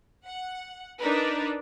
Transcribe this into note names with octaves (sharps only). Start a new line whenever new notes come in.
F#5
D4 D#4 A#4 B4